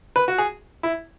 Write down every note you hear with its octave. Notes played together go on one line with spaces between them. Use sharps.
B4
F#4
G#4
E4